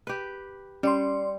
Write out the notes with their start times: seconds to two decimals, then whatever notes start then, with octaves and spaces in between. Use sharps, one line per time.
0.07 G4 B4
0.83 G3 C#4 D5 C6